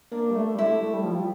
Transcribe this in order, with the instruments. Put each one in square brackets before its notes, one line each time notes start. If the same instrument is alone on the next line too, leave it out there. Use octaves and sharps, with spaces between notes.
[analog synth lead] A#3 [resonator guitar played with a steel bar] D4
[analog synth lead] G3
A3
G3
[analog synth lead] A3 [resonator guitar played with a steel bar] E4
[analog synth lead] A3
G3
F3
G3